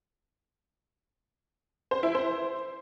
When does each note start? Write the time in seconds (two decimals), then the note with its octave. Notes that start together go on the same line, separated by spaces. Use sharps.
1.91 C5
2.03 E4
2.15 C5